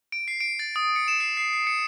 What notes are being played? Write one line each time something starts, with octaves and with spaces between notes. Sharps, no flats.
D7
C7
D7
A6
D#6
C#7
E7
C7
C7
C7
C#7